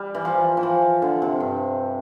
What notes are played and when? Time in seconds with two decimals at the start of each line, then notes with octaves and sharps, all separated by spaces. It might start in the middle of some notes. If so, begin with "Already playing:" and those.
Already playing: G3
0.15 E3
0.25 F3
0.57 E3
0.63 F3
1.02 D3
1.22 C3
1.40 G2